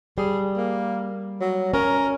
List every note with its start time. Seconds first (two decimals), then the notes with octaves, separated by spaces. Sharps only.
0.18 G3 G#4
0.57 A#3
1.41 F#3
1.74 C#4 A#4